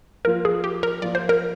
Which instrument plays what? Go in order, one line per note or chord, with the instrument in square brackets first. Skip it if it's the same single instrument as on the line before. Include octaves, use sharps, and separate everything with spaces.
[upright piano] F3 A#3 F4 [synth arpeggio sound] A#4
[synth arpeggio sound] G#4
G4
A#4
[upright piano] F3 A#3 F4 [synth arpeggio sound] D5
[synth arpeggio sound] C5
A#4